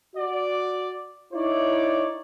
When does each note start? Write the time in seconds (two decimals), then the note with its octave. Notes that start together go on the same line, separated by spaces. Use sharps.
0.15 F#4 D5
1.34 D#4 E4 C#5 D5